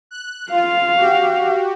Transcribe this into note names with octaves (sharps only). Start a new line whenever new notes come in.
F#6
F4 F5
F#4 G4